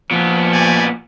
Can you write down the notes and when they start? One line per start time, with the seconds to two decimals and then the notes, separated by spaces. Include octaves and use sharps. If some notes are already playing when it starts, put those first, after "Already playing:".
0.11 A#2 F3 B3
0.52 G4 D5 G#5